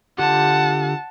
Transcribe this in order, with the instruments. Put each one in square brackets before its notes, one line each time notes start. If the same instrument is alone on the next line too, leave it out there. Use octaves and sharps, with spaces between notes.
[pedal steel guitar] D3 F4 G4 [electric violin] F#5 A5